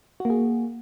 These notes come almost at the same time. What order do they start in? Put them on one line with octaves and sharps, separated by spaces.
F#4 A#3 G#4